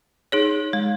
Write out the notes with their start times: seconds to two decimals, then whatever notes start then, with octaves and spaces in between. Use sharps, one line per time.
0.32 D#4 G#4 C#5
0.73 G#3